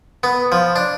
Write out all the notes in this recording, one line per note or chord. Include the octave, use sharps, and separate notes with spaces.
B3
F3
D4